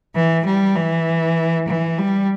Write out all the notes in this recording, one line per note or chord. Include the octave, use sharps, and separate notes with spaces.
E3
G3
E3
E3
G3